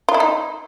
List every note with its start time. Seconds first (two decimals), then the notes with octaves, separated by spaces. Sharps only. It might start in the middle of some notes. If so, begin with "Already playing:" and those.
0.09 F4
0.14 E4
0.20 D#4